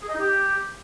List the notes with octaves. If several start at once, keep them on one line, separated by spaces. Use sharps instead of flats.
G#4
D#5
D#4
G4